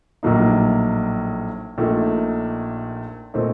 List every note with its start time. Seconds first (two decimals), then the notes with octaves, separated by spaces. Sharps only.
0.23 A#1 A2 F#3 A#3 D#4
1.78 A#1 A#2 A3 D#4
3.34 A#2 A3 C4 D#4